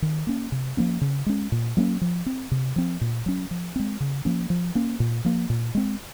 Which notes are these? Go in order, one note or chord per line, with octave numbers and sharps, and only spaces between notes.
D#3
A#3 C#4
C3
F3 A#3 C#4
C#3
G#3 C#4
A#2
F#3 A#3 C#4
F3
C4
C3
F3 C4
A#2
F#3 C#4
F3
G#3 C4
C#3
F3 A#3 C#4
F3
A#3 C#4
A#2
F3 A#3
A#2
G#3 C4